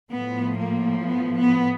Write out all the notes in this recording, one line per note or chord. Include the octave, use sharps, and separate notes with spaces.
A2 F3 B3
A#3
B3
B3